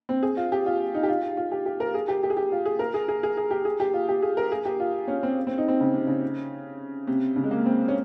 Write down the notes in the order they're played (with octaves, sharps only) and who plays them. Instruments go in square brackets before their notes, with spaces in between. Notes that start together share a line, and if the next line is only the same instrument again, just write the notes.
[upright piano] C4
G#4
F4
G4
F4
D#4
G4
F4
F4
G4
G4
A#4
G#4
G4
G4
G#4
G4
F4
G#4
A#4
G#4
G#4
G#4
G#4
G4
G#4
G4
F4
G4
G#4
A#4
G#4
G4
F4
C#4
C4
C4
D#4
C4
C#3
C3
C#3
C3
C#3
G#3
A#3
C4
C#4